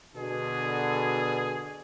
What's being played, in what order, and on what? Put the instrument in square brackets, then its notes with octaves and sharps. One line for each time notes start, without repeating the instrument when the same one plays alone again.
[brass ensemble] B2 D3 [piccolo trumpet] G#4